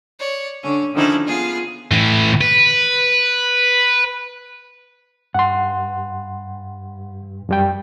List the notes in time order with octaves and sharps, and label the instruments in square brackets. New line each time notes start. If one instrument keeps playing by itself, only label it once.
[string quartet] C#5 D5
D3 C#4
D3 D#3 F3 C#4 D#4 E4
B3 F4 G#4
[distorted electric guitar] A2 E3
B4
[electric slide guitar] G2 [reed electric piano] F#5 C6
[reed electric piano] F#2 G3 G5